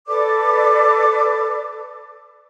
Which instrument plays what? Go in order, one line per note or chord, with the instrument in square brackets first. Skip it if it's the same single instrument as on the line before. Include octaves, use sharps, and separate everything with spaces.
[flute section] A4 B4 D5 D6